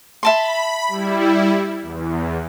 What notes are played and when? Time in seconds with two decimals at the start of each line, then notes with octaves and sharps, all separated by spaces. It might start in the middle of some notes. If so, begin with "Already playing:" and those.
0.23 E5 A5 B5 C6
0.88 G3 E4
1.82 E2